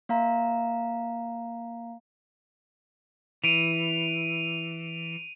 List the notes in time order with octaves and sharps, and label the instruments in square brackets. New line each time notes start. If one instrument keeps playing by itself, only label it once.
[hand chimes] A#3 F5 A#5
[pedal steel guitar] E3 [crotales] D7 D#7 F7